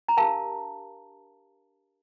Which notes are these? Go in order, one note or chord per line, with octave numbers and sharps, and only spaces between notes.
A#5
D4 G4 A#4 F5 A5